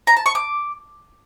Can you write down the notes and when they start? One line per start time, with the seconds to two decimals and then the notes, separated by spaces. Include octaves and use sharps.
0.07 A#5
0.17 A5
0.26 C#6
0.35 D6